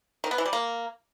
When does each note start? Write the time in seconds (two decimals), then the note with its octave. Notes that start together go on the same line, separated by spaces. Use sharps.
0.24 D#3
0.31 B3
0.38 E3
0.46 G3
0.53 A#3